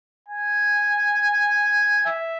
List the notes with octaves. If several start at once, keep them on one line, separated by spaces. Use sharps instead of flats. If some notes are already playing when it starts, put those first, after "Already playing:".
G#5
E5